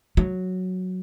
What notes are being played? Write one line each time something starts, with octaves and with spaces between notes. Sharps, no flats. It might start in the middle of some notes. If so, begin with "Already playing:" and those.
F#3